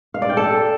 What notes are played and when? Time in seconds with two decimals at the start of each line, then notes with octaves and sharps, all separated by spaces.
0.14 F5
0.22 D5
0.29 G5
0.37 A4